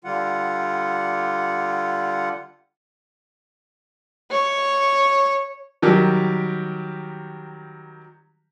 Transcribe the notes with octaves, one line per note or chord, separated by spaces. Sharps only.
D3 G3 F4 F#5
C#5
D#3 F#3 G3 G4 A#4